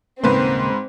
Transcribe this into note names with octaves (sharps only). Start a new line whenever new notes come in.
D#1 G#2 C#3 A#3 C4 B4 C6